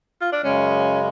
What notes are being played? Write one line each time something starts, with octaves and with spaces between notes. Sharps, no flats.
F4
D4
F#2 C#3 G#3 C#4